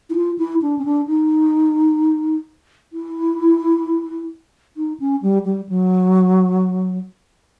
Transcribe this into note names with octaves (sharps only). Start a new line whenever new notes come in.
E4
F4
E4
D4
C#4
D4
D#4
E4
D#4
C#4
G3
G3
F#3